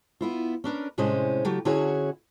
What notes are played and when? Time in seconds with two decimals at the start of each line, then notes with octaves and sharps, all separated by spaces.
0.21 B3 E4 F4
0.64 C#4 D4 A#4 B4
0.98 A2 C3 G#3 C#4 C5 D#5
1.45 C#3 F#3 A3 G4
1.65 D3 C#4 E4 F#4 G#4 C#5